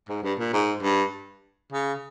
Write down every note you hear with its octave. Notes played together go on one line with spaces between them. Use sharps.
G#2
G2
A#2
G#2
G2
C#3